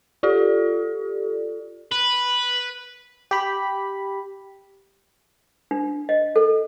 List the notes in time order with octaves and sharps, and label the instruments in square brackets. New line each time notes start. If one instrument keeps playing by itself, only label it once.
[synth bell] F4 G4 A4 D5
[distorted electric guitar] B4
[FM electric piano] G4 B5
[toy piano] D4
D#5
A4